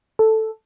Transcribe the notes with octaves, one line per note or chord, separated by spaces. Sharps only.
A4